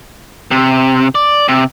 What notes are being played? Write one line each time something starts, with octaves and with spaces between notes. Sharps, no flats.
C3
D5
C3